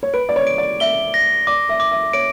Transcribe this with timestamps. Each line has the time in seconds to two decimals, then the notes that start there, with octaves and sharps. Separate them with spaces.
0.03 C#5
0.14 B4 D7
0.29 D5
0.36 C#5
0.47 D7
0.58 D5
0.80 E5 G7
1.14 A#6
1.47 D5 D6
1.69 E5
1.80 D6
1.91 E5
2.13 C#5 D7